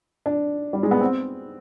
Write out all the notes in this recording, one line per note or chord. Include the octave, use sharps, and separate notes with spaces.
D4
G3
G#3
B3
C4